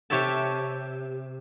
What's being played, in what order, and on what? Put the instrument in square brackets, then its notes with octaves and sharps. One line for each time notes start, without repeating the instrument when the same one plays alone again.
[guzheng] C3 G4 C#5 E5 A5